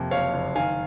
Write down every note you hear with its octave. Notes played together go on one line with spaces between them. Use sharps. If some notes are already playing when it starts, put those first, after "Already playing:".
Already playing: F2 C3 A#3
F#1 C#5 F5
F#1
D#3 F5 G#5